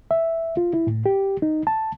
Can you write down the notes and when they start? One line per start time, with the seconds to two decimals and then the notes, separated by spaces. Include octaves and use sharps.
0.11 E5
0.57 F4
0.74 E4
0.87 A2
1.06 G4
1.42 D#4
1.67 A5